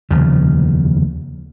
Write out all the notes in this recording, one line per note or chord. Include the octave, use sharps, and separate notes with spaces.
F1 D#2 C#3 F3